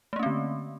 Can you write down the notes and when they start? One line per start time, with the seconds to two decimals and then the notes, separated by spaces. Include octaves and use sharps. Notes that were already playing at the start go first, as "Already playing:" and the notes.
0.13 A3
0.16 A#3
0.19 C#4
0.23 C4
0.26 D3